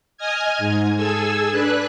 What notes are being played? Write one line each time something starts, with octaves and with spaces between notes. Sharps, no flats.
D#5 G#5 D#6 F6 G#6
G#2
G#4 A4 G#5 E6
D4 B4 F#6